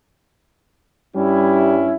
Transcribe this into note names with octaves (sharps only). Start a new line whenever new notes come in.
G2 G3 C#4 E4